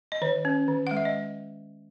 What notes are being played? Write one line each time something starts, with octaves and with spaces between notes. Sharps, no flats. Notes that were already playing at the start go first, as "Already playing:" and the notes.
D#5
D#3 C#5
C#4
D#3
F#5
G#3
E5
D#5